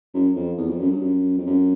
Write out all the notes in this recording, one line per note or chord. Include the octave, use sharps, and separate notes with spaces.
F#2
F2
E2
F2
F#2
G2
F#2
F2
F#2